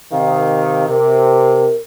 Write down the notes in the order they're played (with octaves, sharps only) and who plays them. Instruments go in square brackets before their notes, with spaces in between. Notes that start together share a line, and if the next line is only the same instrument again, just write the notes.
[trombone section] C3 D#3 [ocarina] F5
[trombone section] C3 [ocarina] A#4